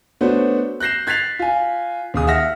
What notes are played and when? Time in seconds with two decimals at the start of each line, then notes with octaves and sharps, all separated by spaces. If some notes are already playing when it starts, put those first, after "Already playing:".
0.21 A3 B3 D4 F#4 C5 C#5
0.80 F#6 G6 A#6 C7 E7
1.07 F#6 G#6 A6 B6 C7 F7
1.39 F4 G#5
2.14 D#2 G#4 D#6
2.27 E5 F#5 F6 A#6